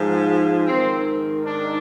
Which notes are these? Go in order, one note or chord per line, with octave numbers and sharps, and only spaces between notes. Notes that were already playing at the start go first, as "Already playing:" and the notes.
Already playing: G#2 F3
G#2 D#3 C4
D4